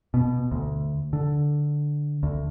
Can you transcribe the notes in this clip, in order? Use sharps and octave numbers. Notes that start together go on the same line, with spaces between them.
B2
D2
D3
D2